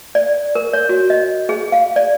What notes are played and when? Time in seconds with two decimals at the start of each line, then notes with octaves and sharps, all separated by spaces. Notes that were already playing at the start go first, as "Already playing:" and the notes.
0.15 D5
0.55 A#4
0.73 C#5
0.89 F#4
1.10 D#5
1.49 G#4
1.72 F5
1.96 D5